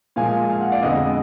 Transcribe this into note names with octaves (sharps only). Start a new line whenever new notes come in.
A#2 F3 G#3 F5 G#5
F5
F#5
D5 F5
F2 D3 G#3 B3 D#5 F#5